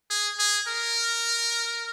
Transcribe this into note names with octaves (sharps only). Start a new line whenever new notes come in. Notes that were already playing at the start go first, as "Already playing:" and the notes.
G#4
G#4
A#4